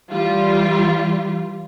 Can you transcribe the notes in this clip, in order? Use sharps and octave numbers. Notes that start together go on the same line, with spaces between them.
E3 G3 F4